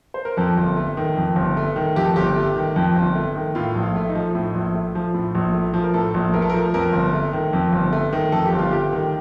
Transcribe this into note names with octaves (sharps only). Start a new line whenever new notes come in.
C5
A#4
F2 A4
G1
A3
D#3
F2
G1
A3
D#3
F2 G4
A4
G1 G4
A3
D#3
F2
G1
A3
D#3
A2 F4
A#1
F4
A3
D#4
F3
A2
A#1
A3
F3
A2
A#1
A3
F3
A#4
A2 A4
A#1
A3 A#4
A4
A#4
F3
F2 A#4
G1
A3
D#3
F2
G1
A3
D#3
F2 A4
G4
G1
F4
A3 G4
D#3